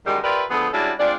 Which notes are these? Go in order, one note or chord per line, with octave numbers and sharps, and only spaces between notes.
F#2 D#3 G3 G#3
F4 G4 A#4 B4 D5 E5
D3 F3 A3 B3 G#4 A4
G3 G#3 C#4 D4 E4 F#4
G#3 C4 D4 F4 D5